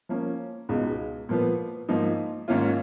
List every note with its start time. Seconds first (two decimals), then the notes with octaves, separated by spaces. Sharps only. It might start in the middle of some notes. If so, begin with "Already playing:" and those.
0.09 F3 A#3 C#4
0.69 C#2 B2 G#3 D#4
1.29 A#2 F3 B3
1.89 G#2 F3 A#3 D#4
2.48 G#2 D#3 A#3 C#4 F4